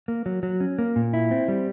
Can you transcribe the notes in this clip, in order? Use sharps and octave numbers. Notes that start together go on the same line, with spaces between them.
A#3
F#3
F#3
C#4
A#3
A#2
E4
C4
G3